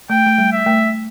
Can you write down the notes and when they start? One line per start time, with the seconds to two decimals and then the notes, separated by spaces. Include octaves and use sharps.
0.10 A3 G5
0.26 A3
0.38 G3
0.52 E5
0.66 A3